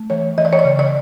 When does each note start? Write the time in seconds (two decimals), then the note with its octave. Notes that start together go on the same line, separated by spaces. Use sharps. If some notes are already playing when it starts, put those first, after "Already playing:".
Already playing: A3
0.10 E3 C#5
0.38 E3 D#5
0.45 D5
0.53 C#5
0.59 D5
0.65 C#3
0.79 D5